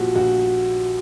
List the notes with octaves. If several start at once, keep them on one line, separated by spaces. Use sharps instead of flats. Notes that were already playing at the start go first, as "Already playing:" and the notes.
Already playing: A#1 A#2 F3 F#4 G4
A#1 F#4